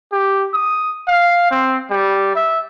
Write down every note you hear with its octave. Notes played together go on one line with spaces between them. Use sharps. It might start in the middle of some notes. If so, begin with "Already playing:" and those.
G4
D#6
F5
C4
G3
E5